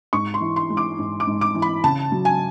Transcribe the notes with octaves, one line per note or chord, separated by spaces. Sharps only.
G#2 C#6
C6
E3
C6
G#3
D6
G#2
D6
G#2
D6
E3
B5
C#3 A5
F#3
G#5